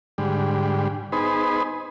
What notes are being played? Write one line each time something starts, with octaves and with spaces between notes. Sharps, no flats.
G#2 D3 G3
B3 D#4 G#4 B4 C5